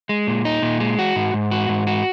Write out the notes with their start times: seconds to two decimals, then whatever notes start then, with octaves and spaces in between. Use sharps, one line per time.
0.09 G#3
0.27 A#2
0.45 D#4
0.62 A#2
0.80 G#3
0.99 F#4
1.16 G#2
1.34 G#2
1.51 F#4
1.69 G#2
1.87 F#4